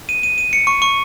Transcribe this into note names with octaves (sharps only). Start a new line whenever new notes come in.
D#7
D#7
D#7
C#7
C#6
C#6